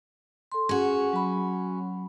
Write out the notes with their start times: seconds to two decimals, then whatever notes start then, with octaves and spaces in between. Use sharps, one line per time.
0.52 A4 C6
0.69 C#4 F#4 G#4
1.13 F#3 B5